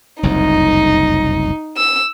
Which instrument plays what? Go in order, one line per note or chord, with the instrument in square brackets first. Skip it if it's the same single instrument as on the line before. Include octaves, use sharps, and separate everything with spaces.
[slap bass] F#1 C2 F2 [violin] D#4
[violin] E6